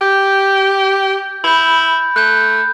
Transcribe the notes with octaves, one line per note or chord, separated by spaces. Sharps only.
G4 G6
E4 B5 G6
A3 F#6 G6